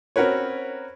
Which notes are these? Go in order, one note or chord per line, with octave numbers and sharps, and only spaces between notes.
C4 C#4 F#4 A#4 B4 C#5